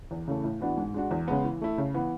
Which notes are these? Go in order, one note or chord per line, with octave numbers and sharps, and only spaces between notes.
E2
C#3 E3 A3
A2
E3 B3 D4 F#4
G#2
G#3 D4 F#4
E2
C#3 G#3 B3
E3
A3 E4
C#3
E3 B3